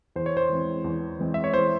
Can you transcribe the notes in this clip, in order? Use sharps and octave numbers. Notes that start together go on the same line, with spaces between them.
E2 C5
C#5
C5
E3 G#3 C4
E2
E3 G#3 C4
E5
C#5
E2 C5